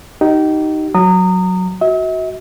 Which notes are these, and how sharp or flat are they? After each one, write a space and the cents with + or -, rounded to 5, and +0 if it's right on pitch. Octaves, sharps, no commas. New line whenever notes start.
D#4 +0 G4 -35
F#3 +0 A#5 -25 D#6 -15
F#4 +0 E5 -45